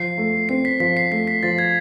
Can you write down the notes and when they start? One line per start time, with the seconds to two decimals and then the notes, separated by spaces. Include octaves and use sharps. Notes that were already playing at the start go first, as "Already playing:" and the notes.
Already playing: F3 C7
0.18 A3
0.49 C4 C7
0.65 B6
0.80 F3 B6
0.97 C7
1.12 A3 B6
1.27 B6
1.43 F3 A6
1.58 G#6